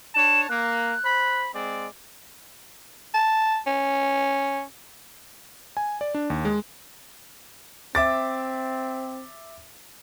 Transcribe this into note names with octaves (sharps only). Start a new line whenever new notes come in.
D4 C#5 A5 E7
A#3 F#6
C5 B5
G#3 C4 D5
A5
C#4
G#5
D5
D4
D#2
G#3
C4 E5 D6 A6